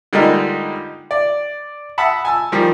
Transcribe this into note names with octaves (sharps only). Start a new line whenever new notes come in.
D3 G3 G#3 A#3 D#4 F4
D5
E5 F#5 A5 B5 D#6 E6
G#5 A5 E6
D#3 F3 G3